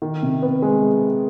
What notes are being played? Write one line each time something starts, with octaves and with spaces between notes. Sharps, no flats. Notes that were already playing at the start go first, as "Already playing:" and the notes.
D#3
C3
B3
G#3